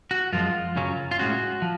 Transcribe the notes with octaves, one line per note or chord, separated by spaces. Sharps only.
F#4
F#2 F3 G#3 F4
F#2 C#3 F#3 C#4
F4
A2 G#3 C#4 F#4
F3